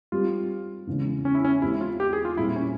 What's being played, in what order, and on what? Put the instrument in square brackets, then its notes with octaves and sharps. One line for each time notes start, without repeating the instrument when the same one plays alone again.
[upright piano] G3 C4 G4 [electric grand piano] F4
[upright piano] E2 C#3 E3 G#3 C#4
[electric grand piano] C#4
E4
C#4
[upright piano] E2 E3 G#3 C4 G4 [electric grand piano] E4
[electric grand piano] F4
G4
G#4
F4
[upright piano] A#2 G3 C4 [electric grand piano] E4
[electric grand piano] C#4